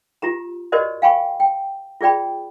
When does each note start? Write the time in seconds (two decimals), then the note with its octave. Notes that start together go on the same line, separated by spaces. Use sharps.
0.22 F4 G4 A#5
0.72 F#4 G4 A#4 C5 D5 D#5
1.02 F5 G5 G#5 B5 C#6
1.40 G5
2.01 F4 G#4 D5 G5 B5